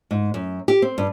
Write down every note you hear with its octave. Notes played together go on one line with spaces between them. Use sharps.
G#2
F#2
G4
C4
G2